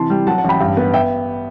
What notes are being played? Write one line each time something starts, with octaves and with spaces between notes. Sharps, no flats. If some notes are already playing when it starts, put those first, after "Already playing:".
Already playing: C3 E3 A5 C6
G3
F#3 F#5 A5
F#5 A5
A1
G5 B5
G2
B3
E5 G5